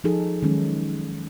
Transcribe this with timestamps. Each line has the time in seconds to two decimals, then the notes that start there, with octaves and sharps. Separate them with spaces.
0.04 F3 D#4 G#4 A4
0.43 D#3 F#3 G#3 C#4 D#4